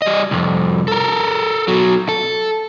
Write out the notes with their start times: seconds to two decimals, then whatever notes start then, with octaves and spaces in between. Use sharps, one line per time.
0.02 G3 D#5
0.31 C2 F2
0.88 A4 A#4
1.68 B2 F#3
2.09 A4